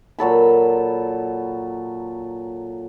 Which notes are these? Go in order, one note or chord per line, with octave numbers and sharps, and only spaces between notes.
A#2 F#3 A4 B5